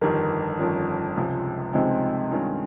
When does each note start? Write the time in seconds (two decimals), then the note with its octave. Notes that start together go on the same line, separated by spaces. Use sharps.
0.01 G1 F2 D#3 G4 A#4
0.59 G1 F2 D#3 C#4 F4
1.16 C#2 C3 F3 G#3
1.73 C#2 C3 F3 G#3 C4 D#4
2.31 G2 D#3 G#3 C#4 F4